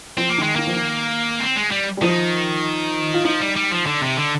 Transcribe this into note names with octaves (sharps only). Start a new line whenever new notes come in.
F3 C4
A#3
D#3 G#3
D#3 A#3
F3
D#3
C4
G#3
G3
G3
D#3 F3
F4
F3 D#4
G3
G3
F3
D3
C3
D3